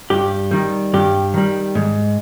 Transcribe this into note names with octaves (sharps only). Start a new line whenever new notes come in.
G2 G4
D#3 G3
G2 G4
D#3 G3
G#2